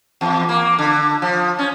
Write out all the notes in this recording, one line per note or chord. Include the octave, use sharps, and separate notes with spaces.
E2
A#3
D3
F3
C#4